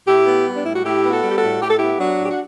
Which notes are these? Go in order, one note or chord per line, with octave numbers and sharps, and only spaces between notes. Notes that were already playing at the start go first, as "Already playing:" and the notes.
A2 E4 G4
B3
G3
D4
A2 E4
F#4
A2 E4 G4
B3
F#4 A4
G3
G4
F#4 A4
A2
A2 G4
A4
B3 E4 G4
F#3 D4 F#4
A2 G4
F#4